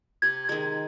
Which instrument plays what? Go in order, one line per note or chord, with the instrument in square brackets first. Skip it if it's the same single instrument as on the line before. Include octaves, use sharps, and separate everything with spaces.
[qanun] C3 [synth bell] G#6
[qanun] D#3 G#3 [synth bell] G#6